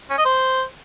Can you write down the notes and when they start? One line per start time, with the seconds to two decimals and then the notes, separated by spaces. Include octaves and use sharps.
0.10 C#4
0.18 D#5
0.26 C5